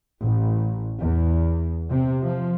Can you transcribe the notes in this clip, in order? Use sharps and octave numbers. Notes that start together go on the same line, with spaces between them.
A1
E2
C3
F3